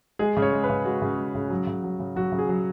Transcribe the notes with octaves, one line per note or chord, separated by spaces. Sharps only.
G#3 G#4
C#3
C#5
G#3
B4
C#3
G#3 F#4
C#3
G#3
C#3
F#3
C#3
F#3
C#3
F#3 F#4
C#3
G#4
F#3